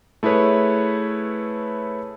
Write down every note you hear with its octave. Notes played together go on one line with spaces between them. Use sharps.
A3 E4 G#4 B4 C#5